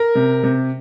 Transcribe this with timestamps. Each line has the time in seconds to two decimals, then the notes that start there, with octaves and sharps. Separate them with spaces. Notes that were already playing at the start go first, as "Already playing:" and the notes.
Already playing: A#4
0.15 C3
0.43 C3